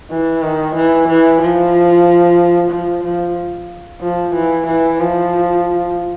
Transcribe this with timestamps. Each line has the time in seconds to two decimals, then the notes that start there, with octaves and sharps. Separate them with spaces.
0.11 E3
0.42 D#3
0.75 E3
1.08 E3
1.41 F3
2.71 F3
3.04 F3
4.01 F3
4.34 E3
4.67 E3
5.00 F3